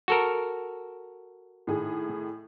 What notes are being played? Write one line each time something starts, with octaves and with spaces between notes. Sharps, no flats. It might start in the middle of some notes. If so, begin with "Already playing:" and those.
F#4 A4 A#4
A2 D#3 G#4